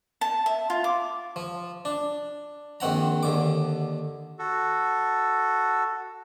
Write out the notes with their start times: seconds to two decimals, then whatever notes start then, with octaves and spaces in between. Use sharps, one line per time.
0.21 A5
0.46 E5
0.70 F4
0.84 D6
1.36 F3
1.85 D4
2.80 A#1 D#3 C4 F#5 A#5
3.23 D#2 D3 D6
4.39 F#4 A4